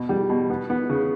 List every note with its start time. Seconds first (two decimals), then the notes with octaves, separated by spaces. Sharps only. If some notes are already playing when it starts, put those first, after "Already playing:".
Already playing: B2
0.09 G3
0.30 B2
0.50 B3
0.70 B3
0.90 C#3